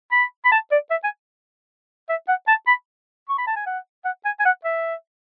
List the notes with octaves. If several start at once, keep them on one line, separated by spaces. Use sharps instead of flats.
B5
B5
A5
D5
E5
G#5
E5
F#5
A5
B5
C#6
B5
A5
G#5
F#5
F#5
G#5
G#5
F#5
E5